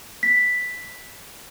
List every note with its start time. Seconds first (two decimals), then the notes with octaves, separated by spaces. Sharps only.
0.23 B6